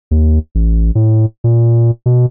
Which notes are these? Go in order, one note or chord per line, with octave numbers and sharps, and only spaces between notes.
D#2
A1
A2
A#2
B2